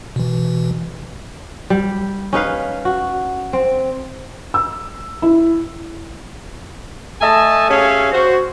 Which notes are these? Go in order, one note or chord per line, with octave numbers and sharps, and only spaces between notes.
B2 E3
G3
C#4 D#4 B4 F5
F#4
C4
E6
E4
A3 D#5 E5 G#5 A5
C#4 G4 G#4 C#5 E5 F5
F#4 C5